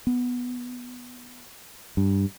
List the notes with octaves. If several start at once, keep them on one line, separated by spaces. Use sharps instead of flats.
B3
G2